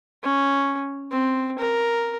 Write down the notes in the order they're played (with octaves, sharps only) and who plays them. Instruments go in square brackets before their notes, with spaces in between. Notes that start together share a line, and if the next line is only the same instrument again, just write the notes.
[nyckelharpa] C#4
C4
A#4